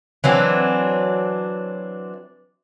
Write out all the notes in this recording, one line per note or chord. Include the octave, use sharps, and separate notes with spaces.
E3 F#3 C4 D4